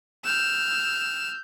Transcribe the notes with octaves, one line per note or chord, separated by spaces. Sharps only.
E6 F6 G6 E7